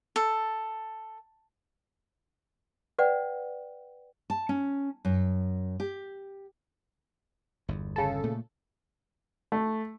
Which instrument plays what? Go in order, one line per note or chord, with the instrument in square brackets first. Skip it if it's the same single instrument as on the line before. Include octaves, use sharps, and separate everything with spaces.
[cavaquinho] A4
[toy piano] B4 D5 F#5 G5
[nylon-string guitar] A5
C#4
F#2
G4
[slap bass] G1 E2
[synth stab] C#3 A4
[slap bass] A#2 A3
[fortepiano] A3